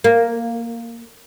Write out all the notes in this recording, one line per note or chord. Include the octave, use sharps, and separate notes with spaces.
A#3